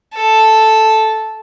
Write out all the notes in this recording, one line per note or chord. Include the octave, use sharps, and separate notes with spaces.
A4